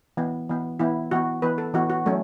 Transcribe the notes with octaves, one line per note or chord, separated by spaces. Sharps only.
E3 B3
E3 B3
E3 B3 E4
E3 B3 F#4
E3 B3 B4
A4
E3 B3 F#4
F#4
F#3 A3 C#4